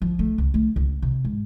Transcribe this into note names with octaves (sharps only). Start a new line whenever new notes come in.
F3
A3
C#2
A3
C#2
C3
G#2